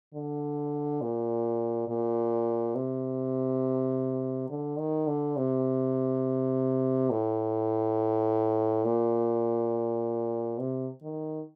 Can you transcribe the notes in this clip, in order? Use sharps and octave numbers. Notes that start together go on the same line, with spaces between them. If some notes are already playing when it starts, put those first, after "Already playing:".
D3
A#2
A#2
C3
D3
D#3
D3
C3
A2
A#2
C3
D#3